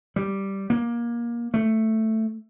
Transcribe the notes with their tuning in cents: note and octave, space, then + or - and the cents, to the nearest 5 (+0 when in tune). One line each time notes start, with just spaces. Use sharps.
G3 -5
A#3 +20
A3 +5